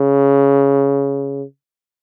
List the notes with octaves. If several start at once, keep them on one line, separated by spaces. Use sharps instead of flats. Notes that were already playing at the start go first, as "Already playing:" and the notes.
Already playing: C#3